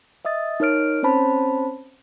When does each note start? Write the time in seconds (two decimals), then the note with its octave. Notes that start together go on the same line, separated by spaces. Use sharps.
0.25 D#5 E5 D#6 A6
0.60 D#4 A#4 C#5 F6 D7
1.03 C4 C#4 C5 C#5 A5 B5